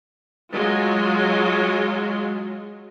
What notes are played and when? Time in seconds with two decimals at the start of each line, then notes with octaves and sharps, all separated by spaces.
0.53 F#3 G#3 F4